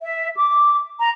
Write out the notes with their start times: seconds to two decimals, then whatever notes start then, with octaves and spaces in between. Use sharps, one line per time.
0.01 E5
0.36 D6
1.00 A#5